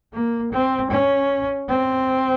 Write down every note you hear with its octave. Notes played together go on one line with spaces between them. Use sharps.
A#3
C4
C#4
C4